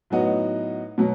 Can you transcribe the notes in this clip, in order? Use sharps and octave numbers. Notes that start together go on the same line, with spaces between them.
A2 F#3 B3 D#4 F#4
B2 F#3